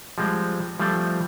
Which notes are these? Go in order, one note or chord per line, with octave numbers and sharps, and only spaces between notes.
F3 G3 G#3 C4
F3 G3 A3 C4